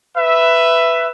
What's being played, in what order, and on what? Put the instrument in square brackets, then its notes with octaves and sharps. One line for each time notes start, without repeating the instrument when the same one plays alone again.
[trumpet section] B4 E5